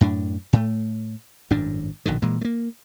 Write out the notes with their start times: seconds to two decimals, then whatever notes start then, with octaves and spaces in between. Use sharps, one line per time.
0.01 F#2 A2 D4
0.53 A2 A3
1.50 G#1 F#2 A2 D4
2.06 A#1 B2 D3 D#3
2.22 A#2 E3 G#3
2.41 A3 A#3